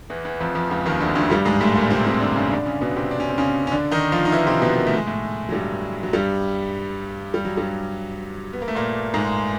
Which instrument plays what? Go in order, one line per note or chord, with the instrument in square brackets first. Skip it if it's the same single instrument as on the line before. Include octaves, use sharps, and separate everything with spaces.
[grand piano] E2 E3
E2 E3
F2 F3
F2 F3
C#2 C#3
D#2 D#3
D2 D3
D2 D3
G2 G3
G#2 G#3
A2 A3
A#2 A#3
C3 C4
C3 C4
D3 D4
C#3 C#4
D3 D4
C#3 C#4
B2 B3
C3 C4
D4
C#4
C4
C#3 C#4
C#4
D3 D4
D#3 D#4
F3 F4
D#4
E3 E4
C3 C4
B2 B3
A#3
A3
G#3
A2 A3
F#3
G2 G3
F#3
G2 G3
G3
F#3
G2 G3
B3
A#3
A3
A#2 A#3
G#2 G#3